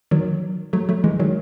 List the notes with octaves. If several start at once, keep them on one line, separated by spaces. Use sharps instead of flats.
D#3 F#3
F#3 A3
F#3 A3
E3 G#3
D#3 F#3